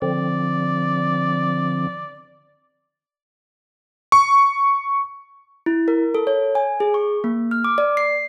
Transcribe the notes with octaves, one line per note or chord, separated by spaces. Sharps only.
D3 F3 C4 D5
C#6
E4
A#4
A4
C#5
G#5
G#4
C#6
A#3
F6
D6
D5
C7